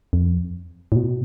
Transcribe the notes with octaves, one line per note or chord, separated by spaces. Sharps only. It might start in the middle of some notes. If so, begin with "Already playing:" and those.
F2
A2
B2